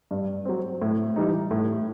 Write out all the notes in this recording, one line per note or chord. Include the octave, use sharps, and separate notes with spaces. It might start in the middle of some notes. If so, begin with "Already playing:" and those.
G2
F#3 C4
A2
E3 G3 D#4
A2